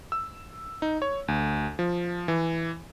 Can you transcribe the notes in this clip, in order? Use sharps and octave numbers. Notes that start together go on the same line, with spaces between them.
E6
D#4
C#5
D2
F3
E3